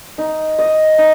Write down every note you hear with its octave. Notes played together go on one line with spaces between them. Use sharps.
D#4
D#5
D#4